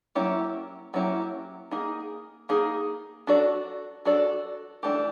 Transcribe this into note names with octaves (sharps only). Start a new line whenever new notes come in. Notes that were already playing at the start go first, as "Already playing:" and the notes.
F#3 A#3 C#4 E4 G4
F#3 A#3 C#4 E4 G4
A#3 D#4 G#4
A#3 D#4 G#4
D4 F#4 A4 D5
D4 F#4 A4 D5
E3 A3 D4 G4